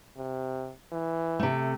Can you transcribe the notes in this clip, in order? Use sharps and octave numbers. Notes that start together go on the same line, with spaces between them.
C3
E3
C3 A3